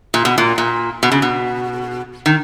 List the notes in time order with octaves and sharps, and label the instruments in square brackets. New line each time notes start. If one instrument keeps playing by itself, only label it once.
[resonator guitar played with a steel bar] A#2
B2
A#2
A#2
B2
C#3
B2
D#3